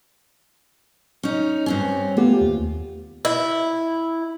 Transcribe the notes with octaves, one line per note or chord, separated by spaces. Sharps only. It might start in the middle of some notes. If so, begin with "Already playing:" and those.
C#4 D#4
G2 C4 C#4
A3 B3 F4 G4
D#2
E4